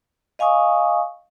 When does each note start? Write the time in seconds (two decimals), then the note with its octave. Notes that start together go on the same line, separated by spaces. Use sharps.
0.39 D#5 F5 G#5 C#6 D#6